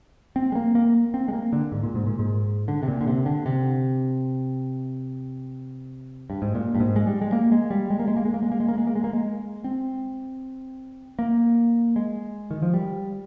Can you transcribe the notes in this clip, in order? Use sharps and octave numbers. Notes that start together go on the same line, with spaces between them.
C4
G#3
A#3
A#3
C4
G#3
A#3
D3
G#2
A#2
G#2
A#2
G#2
D3
C3
A#2
D3
C3
D3
C3
G2
G#2
A#2
G2
G#2
G#3
G3
G#3
A#3
G#3
G3
G#3
A#3
G#3
A#3
G#3
A#3
G#3
A#3
G#3
A#3
G#3
A#3
G#3
A#3
G#3
C4
A#3
G#3
D#3
F3
G3